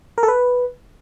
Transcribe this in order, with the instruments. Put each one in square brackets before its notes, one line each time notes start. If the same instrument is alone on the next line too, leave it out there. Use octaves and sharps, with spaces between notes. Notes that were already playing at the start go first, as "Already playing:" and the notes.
[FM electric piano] A#4
A4
B4